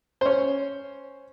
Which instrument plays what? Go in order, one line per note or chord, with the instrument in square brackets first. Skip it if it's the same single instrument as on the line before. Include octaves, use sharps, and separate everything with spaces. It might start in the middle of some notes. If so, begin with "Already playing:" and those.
[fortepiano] C#4 C5